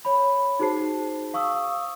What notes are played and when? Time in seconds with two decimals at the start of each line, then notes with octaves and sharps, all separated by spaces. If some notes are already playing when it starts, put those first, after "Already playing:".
0.05 C#5 B5
0.59 D#4 F#4 G#4 C5 A5 C7
1.34 F5 C#6 D#6 E6